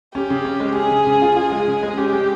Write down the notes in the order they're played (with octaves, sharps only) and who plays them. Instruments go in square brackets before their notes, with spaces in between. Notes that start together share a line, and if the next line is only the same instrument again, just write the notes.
[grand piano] C#4 [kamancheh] G4
[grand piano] C#3
C#4
G#3
[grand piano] C#4 [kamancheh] G#4
[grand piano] C#3
C#3
F4
[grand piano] F4 [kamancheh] G#4
[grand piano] G#3
C#3
G#3
[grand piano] C#4 [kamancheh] G4
[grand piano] G#3